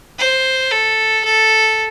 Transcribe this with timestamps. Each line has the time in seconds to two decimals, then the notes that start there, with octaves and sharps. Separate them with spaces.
0.19 C5
0.71 A4
1.25 A4